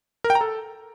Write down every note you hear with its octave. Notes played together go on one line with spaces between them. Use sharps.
A#4
G5
A#5
A4